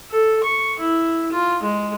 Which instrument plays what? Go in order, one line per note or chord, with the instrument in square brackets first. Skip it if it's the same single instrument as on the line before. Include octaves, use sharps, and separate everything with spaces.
[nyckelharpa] A4
C#6
E4
F4
G#3